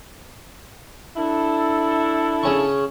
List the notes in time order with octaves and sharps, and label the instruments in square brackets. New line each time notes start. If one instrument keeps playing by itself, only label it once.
[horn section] D4 E4 A4
[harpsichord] C#3 C#4 C#6